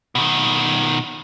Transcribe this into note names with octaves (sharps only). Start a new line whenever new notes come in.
B2 D#3